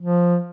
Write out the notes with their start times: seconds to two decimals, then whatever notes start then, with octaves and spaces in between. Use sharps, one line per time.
0.02 F3